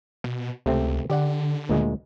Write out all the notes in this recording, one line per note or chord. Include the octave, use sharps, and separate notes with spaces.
B2
C#2 C3 A3 C4
D3 G4 D5 F#5
D2 A#2 G#3